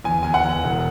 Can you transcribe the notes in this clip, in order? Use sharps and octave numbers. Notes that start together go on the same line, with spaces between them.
E2 G#5
E2 G#5
F#5
E2
E1